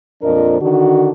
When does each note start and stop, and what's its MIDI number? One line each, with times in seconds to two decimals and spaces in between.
0.23 0.57 41
0.23 0.57 46
0.23 0.57 53
0.23 0.57 62
0.23 0.57 70
0.23 0.57 75
0.61 1.11 50
0.61 1.11 51
0.61 1.11 62
0.61 1.11 66